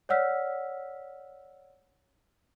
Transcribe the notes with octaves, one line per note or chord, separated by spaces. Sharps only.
C#5 D5 F#5 E6 F6 B6